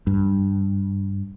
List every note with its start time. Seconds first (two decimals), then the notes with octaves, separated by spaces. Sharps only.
0.07 G2